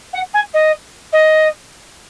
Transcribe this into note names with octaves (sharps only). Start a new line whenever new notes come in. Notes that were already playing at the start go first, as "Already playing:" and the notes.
F#5
G#5
D#5
D#5